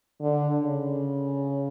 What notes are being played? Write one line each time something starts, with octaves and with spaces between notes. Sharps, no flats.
D3
C#3